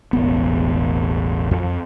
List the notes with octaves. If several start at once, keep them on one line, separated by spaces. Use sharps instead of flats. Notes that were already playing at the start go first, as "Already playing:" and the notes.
E1 A1 B3
F2